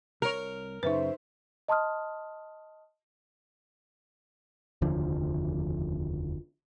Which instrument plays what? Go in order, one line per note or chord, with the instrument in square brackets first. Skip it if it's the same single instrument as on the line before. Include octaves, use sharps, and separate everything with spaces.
[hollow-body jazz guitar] C2 C#5 [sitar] A#4
[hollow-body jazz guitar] F#2 C#3 [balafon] D#4 B4 [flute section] C5 E5
[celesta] D#5 A5 C6 D#6 F6
[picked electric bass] F1 D#2 D3 F3